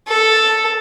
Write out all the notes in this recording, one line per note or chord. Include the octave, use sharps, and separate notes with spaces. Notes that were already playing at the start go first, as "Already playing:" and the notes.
A4